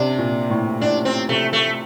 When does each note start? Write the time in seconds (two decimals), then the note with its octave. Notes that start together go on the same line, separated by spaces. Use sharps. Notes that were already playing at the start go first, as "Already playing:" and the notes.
Already playing: C3 D4
0.18 A#2
0.50 A2
0.81 A2 D4
1.05 C4
1.29 C3 A3
1.53 A3